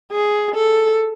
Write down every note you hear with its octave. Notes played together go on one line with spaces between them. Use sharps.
G#4
A4